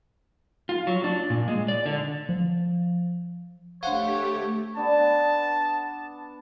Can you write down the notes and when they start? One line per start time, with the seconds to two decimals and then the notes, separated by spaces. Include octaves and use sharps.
0.69 F4
0.87 F#3
1.04 D4
1.30 A#2
1.48 G#3
1.68 D5
1.86 D3
2.29 F3
3.83 A3 D4 G4 C5 C#5 F5 F#5
4.77 B3 D4 A5